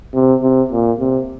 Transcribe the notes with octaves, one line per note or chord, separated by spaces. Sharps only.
C3
C3
A#2
C3